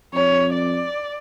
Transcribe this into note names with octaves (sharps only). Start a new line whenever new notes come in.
F2 C#5
D5